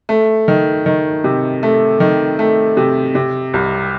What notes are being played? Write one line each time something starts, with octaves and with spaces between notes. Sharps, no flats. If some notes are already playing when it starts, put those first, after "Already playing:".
A3
D#3
D#3
C3
A3
D#3
A3
C3
C3
C2